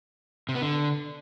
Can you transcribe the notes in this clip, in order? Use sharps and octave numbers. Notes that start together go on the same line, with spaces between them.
C3
B3
D3